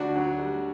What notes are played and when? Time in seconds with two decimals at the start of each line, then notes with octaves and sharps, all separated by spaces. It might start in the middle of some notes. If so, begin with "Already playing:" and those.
Already playing: D2 D4 F#4
0.16 F#3
0.38 G3